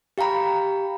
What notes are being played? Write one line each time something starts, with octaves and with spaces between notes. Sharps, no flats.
G4 F5 G5 A#5 B5